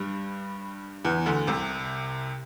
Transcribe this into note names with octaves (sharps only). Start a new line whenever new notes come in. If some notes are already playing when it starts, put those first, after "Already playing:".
Already playing: G2 G3
E2 E3
D2 D3
C2 C3